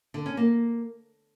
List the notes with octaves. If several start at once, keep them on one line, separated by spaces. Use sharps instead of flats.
D3
C#4
A#3